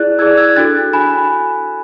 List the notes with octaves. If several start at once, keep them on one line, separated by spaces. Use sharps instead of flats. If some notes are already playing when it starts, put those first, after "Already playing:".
Already playing: E4 G#4 D5 F#6 A6
E4 G#4 D5 E6 G#6
E6 G#6
D4 F#4 A4 F#6 A6
D4 G#5 B5